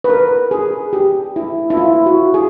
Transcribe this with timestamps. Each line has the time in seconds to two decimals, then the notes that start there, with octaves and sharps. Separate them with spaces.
0.04 B4
0.10 A#4
0.51 G#4
0.93 G4
1.36 E4
1.70 E4
1.77 F4
2.06 F#4
2.34 G#4